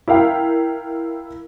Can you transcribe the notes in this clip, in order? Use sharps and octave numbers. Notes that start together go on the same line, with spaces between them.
E4 A#4 F5 G5